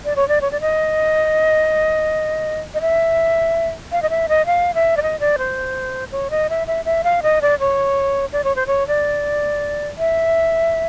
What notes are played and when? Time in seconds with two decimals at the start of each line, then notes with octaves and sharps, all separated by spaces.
0.05 D5
0.16 C#5
0.28 D5
0.41 C#5
0.52 D5
0.61 D#5
2.74 D#5
2.81 E5
3.92 F5
4.02 D#5
4.10 E5
4.29 D#5
4.46 F5
4.75 E5
4.97 D5
5.02 D#5
5.20 D5
5.38 C5
6.12 C#5
6.30 D#5
6.50 E5
6.67 E5
6.85 E5
7.04 F5
7.23 D#5
7.42 D5
7.59 C#5
8.32 D5
8.44 C#5
8.56 C5
8.67 C#5
8.88 D5
9.98 E5